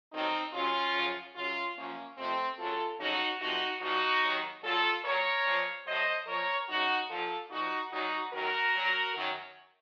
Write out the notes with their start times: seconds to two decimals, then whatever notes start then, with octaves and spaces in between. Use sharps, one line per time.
0.11 F2 D#3 F#3 C4 D#4
0.53 D#2 C#3 F#3 C#4 F4
0.94 F#2 C#3 F3
1.35 F#2 C#3 F#3 C#4 F4
1.76 F#2 F3 A#3 C#4
2.17 F2 C3 F3 A3 C4
2.57 F#2 C#3 F#3 F4 A4
2.98 F2 C#3 F#3 D#4 F#4
3.40 F2 C3 F3 D#4 F#4
3.81 A#2 F3 D#4 F#4
4.22 D#2 D#3 F#3
4.63 A#2 F#3 F4 A4
5.04 A#2 F#3 A#4 C#5
5.45 A#2 F3
5.86 A2 F#3 C5 D#5
6.27 A#2 F3 A#4 C#5
6.68 F#2 C#3 F#3 D#4 F#4
7.09 A#2 F3 F4 A4
7.50 A#2 F3 D#4 F#4
7.91 A#2 F#3 D#4 F#4
8.32 F#2 D#3 F#3 F#4 A#4
8.73 A#2 F#3
9.14 F#2 D#3 F#3